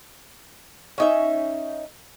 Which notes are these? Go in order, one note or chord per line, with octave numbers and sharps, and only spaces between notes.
C#4 D#4 E5